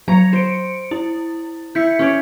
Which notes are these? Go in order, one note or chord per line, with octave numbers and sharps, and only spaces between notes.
F#3 C#5 A#5 C#7
C5 C#7 D7
E4
E4 G6 B6 C#7
C#4 C#5 D5